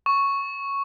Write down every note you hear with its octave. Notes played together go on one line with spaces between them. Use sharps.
C#6